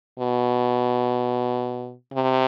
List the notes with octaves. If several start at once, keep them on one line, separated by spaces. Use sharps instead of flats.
B2
C3